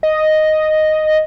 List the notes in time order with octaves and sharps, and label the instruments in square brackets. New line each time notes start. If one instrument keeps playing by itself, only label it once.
[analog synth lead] D#5